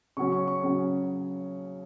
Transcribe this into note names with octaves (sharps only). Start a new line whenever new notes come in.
C#3 F#3 C#4 C#6
C#6
C#6
C#3 F#3 C#4